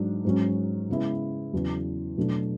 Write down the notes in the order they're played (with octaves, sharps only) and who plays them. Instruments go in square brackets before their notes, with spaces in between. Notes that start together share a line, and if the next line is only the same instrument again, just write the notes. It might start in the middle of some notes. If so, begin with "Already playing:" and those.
Already playing: [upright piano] G#2 F#3 D4
G#2 F#3 C#4
C#3 G#3 B3 E4
E2 C#3 F#3
B2 F#3 A3 D4